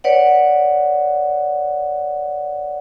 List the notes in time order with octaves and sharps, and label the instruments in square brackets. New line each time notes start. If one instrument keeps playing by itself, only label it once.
[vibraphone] B4 C#5 D5 F#5